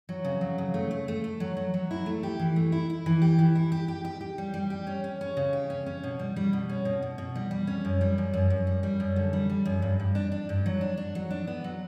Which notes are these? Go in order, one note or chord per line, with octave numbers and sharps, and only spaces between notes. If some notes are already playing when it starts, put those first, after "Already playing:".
F#3
C#3
F#3
C#3
A3
A3
A3
A3
F#3
F#3
F#3
E4
A3
G4
E3
A3
E4
E4
E3
G4
E3
E4
G4
G4
G4
G4
G3
G3
G4
C#4
C#4
C#4
C#3
G4
C#4
C#4
B2
G3
G3
B2
C#4
B2
B2
B2
G3
G3
C#4
F#2
G3
F#2
F#2
F#2
G3
G3
F#2
D3
G3
G3
F#2
G2
G2
D4
D4
G2
F#3
D4
D4
F#3
D4
B3
F#3